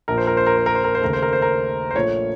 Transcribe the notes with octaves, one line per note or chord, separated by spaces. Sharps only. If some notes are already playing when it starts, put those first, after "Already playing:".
A#1 A#2 F3 A#4
C5
A#4
C5
A#4
C5
A#4
C5
A#4
C5
D#2 C#3 A3 A#4
C5
A#4
C5
A#4
C5
A#1 A#2 A3 C#5